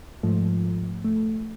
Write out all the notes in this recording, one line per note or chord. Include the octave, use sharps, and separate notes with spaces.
G#2 F3 A3
A3